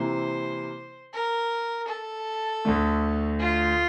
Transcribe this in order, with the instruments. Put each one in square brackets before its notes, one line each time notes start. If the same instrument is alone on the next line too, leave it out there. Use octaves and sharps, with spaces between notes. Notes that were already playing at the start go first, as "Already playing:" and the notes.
Already playing: [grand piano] C3 E3 A#3 E4 [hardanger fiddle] C5
[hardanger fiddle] A#4
A4
[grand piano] D2 D3 A3
[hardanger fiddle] F4